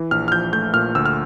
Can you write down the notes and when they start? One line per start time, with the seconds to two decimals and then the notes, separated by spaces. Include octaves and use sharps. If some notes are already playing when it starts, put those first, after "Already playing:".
Already playing: E3
0.11 A#1 F6
0.28 F6
0.32 F3 G6
0.53 A3 G6
0.74 A#2 F6
0.95 D2 E6
1.06 F6